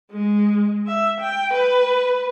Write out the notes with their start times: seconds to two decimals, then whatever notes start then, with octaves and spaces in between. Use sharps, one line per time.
0.11 G#3
0.87 E5
1.21 G5
1.53 B4